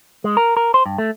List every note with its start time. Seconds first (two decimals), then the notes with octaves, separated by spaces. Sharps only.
0.24 G#3
0.37 A#4
0.57 A#4
0.74 C5
0.86 G2
0.98 A3